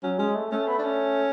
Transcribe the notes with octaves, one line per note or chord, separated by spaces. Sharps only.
F#3 C#4
G#3 C#4
A3
A3 C#4
B3
D4
C#4